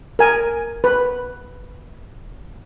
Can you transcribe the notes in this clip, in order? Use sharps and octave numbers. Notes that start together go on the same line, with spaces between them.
A#4 G#5
B4